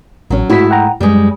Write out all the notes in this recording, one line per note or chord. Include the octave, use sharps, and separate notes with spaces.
A1 F#3 C#4
G#2 A3 E4 F#4 B6
F#5 G5 A#5
F#2 G3 G#3